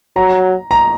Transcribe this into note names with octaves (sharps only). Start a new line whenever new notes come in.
F#3 A#5
A#5